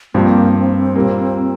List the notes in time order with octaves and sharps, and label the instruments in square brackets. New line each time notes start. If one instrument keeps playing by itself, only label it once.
[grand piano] G2 F3 C4 G4 [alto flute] A#3
[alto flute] C4
[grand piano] A#2 G3 A#3